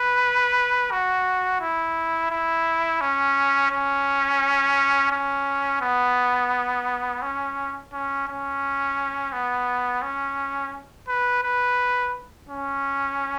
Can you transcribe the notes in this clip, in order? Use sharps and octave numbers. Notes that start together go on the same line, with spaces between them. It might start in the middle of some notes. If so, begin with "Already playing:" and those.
Already playing: B4
F#4
E4
E4
C#4
C#4
C#4
B3
C#4
C#4
C#4
B3
C#4
B4
B4
C#4